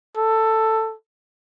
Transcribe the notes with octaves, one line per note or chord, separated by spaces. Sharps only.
A4